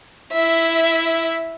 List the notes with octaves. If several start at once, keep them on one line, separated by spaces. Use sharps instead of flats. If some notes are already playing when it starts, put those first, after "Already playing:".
E4 E5